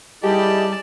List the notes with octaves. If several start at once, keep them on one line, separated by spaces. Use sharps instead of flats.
G3 E4 G4 G#4 D5 D#5 A5